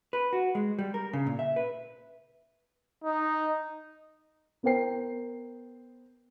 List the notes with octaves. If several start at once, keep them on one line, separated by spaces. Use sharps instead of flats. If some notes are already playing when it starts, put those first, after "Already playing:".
B4
F#4
G#3
G3
A#4
C#3
A#2
E5
B4
D#4
B3 A#4 C5 G5 C7